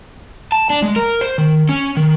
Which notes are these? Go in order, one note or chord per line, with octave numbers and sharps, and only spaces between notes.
A5
D4
G#3
A#4
C5
D#3
C#4
D#3